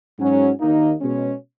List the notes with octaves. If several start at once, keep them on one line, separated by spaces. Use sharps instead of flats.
G#2 F#3 C#4
D#2 D#3 A#3 D#4
B2 G#3 C#4